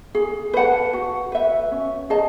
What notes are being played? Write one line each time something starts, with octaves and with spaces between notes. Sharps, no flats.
G#4
B4 F#5 A5
F#4
B4 E5
C#4
G#4 D#5 A5